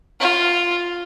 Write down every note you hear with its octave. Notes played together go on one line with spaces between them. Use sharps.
F4